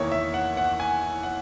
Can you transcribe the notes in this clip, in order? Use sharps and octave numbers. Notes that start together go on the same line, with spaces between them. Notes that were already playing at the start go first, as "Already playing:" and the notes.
Already playing: E2 D#3 A#3 E4 C#5
E5
F#5
F#5
G#5
F#5